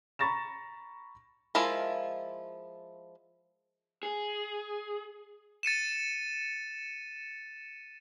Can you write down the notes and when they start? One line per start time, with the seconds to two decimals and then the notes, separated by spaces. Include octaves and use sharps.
0.19 A#5 B5 C#6 A6 A#6 E7
1.55 F3 G#3 E4 F4 A#4
4.03 G#4
5.63 A6 C#7 D#7 E7